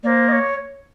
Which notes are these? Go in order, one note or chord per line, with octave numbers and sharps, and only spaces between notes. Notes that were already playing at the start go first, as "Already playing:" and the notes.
A#3 C5 D5
D#5
C#5